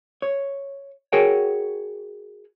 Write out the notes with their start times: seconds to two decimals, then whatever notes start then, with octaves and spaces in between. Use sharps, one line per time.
0.22 C#5
1.13 F#4 G#4 A#4 C#5 F#5 G5